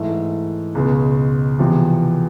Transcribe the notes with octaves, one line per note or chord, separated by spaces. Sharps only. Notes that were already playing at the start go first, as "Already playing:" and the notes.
Already playing: G#2 E3 A3
C#2 B2 G#3
E2 C3 F3